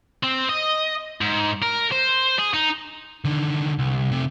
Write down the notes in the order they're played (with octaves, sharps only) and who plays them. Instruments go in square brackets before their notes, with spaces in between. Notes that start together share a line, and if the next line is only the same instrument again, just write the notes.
[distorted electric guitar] C4
D#5
G#2
A#4
C5
G#4
D#4
[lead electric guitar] D3 D#3
C2
C3 A3